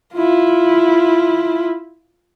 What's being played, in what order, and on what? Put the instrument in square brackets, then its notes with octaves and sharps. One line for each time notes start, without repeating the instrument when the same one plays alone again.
[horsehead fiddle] E4 F4